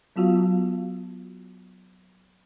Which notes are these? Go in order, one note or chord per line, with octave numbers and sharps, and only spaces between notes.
F#3 B3 F4 F#4 F5